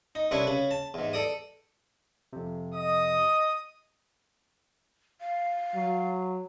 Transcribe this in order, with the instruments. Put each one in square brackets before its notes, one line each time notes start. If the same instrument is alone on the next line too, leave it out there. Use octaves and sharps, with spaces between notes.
[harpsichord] D#4
C2 C#4 D4 E4 B4 C#6
C#3 C#4 B5
A5
E2 G#2
A4 D5 D#6
[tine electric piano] F2 C3
[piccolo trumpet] D#5 [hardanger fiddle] D#6
[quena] F5
[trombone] F#3